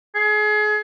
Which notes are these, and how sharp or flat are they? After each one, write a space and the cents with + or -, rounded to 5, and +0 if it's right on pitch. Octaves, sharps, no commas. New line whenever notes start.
G#4 +30